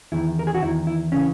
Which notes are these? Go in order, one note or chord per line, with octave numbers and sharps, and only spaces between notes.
E2 D#3 E4
A#4
G#4
F#4
E2 D#3 E4
E4
C#3 E3 C#4